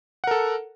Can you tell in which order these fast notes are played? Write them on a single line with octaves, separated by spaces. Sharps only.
F#5 A#4 A4